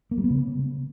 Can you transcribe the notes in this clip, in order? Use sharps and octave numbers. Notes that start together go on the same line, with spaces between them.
A#3
G3
B3
C#3